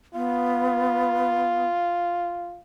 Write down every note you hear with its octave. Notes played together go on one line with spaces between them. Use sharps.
B3 F4